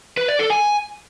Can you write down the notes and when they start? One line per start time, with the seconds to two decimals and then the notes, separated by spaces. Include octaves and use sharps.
0.17 B4
0.28 D5
0.39 A4
0.50 G#5